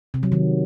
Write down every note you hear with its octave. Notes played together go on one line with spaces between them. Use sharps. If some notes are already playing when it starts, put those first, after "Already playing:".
C3
F#3
D#3